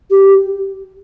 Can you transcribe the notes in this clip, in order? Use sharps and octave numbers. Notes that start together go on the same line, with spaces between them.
G4